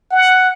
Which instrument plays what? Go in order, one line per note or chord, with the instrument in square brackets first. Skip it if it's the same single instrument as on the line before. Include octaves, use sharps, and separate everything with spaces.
[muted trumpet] F#5